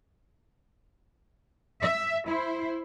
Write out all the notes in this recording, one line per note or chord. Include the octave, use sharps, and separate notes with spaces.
E5
E4 C5